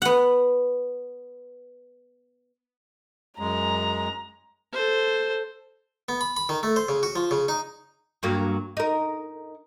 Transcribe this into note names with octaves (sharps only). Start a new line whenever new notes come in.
B3 F#5
F#2 G#3 A#5
A4 C5
B3
B5
B5
D#3
A3
C5
C#3
F#4
F3
C#3
D#4
G2 F#3 A#3
D#4 A#4